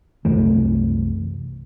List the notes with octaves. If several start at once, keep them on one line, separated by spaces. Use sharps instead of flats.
C2 F#2 E3 A3